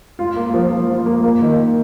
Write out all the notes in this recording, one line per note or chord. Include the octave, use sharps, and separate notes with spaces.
F4
A#3
F3
F3
F4
A#3
A#3
D#3